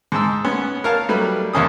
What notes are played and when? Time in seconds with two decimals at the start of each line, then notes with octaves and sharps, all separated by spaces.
0.12 G#2 G#3 A5 E6
0.45 B3 C#4
0.84 A#4 C#5 F5 A5
1.09 F#3 G3 A3 B4
1.53 E2 C3 A#3 C#4 A4 D#6